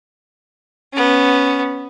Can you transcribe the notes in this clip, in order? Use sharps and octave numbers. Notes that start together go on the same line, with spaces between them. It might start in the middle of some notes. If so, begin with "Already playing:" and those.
B3 C#4